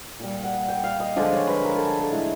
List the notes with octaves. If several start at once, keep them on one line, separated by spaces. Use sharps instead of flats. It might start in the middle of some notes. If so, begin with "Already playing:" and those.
A#2 G3
F#5
G5
F5
D#5
D3 F3 G#3 D5
C#5
B4
A#4
A4
G#4
A4
A2 E3 G#3 A4